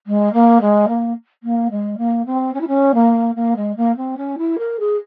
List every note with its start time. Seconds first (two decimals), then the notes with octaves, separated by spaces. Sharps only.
0.07 G#3
0.33 A#3
0.61 G#3
0.88 A#3
1.43 A#3
1.71 G#3
1.98 A#3
2.26 C4
2.54 C#4
2.61 E4
2.67 C#4
2.94 A#3
3.35 A#3
3.56 G#3
3.77 A#3
3.97 C4
4.17 C#4
4.38 E4
4.58 A#4
4.79 G#4